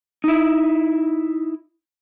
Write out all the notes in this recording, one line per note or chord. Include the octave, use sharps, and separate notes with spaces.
D#4 E4